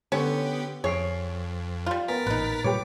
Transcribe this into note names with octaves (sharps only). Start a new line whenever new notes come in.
D3 B3 C#4 G4 C#5
F2 G#4 C#5 C7 D7
G3 F4
B3 A#4 G#5 A6 B6
A1 A#2 D#4 B4
A#2 G3 A#3 G4 B4 C#5 D6